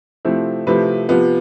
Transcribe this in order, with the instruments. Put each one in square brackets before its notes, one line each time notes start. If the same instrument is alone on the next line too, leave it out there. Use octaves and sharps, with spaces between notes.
[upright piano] C3 F3 A3 C4 E4
C3 F3 A3 C4 E4 B4
C3 F3 B3 F4